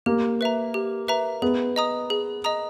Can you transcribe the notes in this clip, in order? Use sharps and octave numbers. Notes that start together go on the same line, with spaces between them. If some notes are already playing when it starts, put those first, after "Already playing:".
A#3 G4
B4 E5 A#5
G4
B4 E5 A#5
B3 G#4
D#5 A#5 D#6
G#4
D#5 A#5 D#6